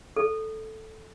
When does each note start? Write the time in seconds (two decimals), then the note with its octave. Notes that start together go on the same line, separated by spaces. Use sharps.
0.16 A4